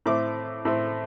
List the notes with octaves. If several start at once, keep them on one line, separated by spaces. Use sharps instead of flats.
A2 A3 C4 D6
A2 A3 C4